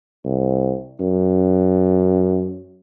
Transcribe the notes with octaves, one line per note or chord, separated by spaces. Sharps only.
C2
F#2